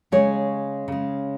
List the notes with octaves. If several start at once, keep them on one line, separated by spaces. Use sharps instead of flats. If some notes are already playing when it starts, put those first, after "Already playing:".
C#3 G#3 G#4 C#5
C#3 G#3